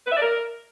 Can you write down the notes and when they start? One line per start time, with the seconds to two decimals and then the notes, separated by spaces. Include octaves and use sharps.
0.07 B4
0.12 E5
0.17 D5
0.22 A#4